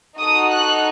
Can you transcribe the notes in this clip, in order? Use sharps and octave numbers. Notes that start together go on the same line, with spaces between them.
D#4 F#4 A4 D#6
F#6